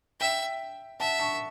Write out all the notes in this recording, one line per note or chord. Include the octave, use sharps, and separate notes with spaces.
E5 G5
E5 F#5 A5
A5 C#6